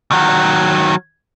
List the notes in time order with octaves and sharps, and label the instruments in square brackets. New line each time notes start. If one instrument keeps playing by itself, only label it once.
[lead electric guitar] D#3 F#3